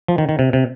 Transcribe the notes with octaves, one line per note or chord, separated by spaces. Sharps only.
F3
D#3
D#3
C3
C3